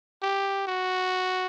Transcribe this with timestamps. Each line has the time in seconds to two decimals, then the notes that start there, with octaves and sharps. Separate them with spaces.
0.22 G4
0.67 F#4